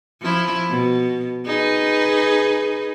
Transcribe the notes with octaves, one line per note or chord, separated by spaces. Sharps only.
F3 E4
B2
D#4 G#4 B4